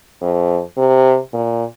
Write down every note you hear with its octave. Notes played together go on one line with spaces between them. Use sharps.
F2
C3
A#2